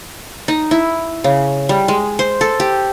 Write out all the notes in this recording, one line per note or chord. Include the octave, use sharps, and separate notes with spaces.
D#4
E4
C#3
G3
G#3
C5
A4
G4